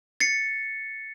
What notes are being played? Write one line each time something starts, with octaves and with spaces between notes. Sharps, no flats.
A6 C7 C#7